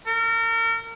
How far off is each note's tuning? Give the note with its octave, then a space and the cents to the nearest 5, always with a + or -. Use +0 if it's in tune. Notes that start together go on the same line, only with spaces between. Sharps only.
A#4 -35